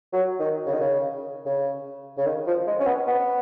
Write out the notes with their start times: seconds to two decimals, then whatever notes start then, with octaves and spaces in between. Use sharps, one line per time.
0.13 F#3
0.39 D#3
0.66 C#3
0.73 D#3
0.80 C#3
1.46 C#3
2.18 C#3
2.26 D#3
2.47 F3
2.67 G#3
2.80 C#4
2.87 B3
3.07 B3